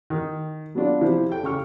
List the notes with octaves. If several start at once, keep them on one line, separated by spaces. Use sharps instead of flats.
D#3
F#3 B3 D4 F4
C3 F3 E4 G4
A4 G5
C#3 G4 C#6 F6